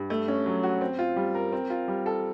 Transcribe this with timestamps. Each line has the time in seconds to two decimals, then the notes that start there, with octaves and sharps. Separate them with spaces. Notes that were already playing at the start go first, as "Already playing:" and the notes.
Already playing: G2
0.10 A3
0.28 C#4
0.46 F#3
0.63 F#4
0.81 C4
0.99 F4
1.16 G3
1.35 A#4
1.52 C4
1.70 F4
1.88 G3
2.06 A4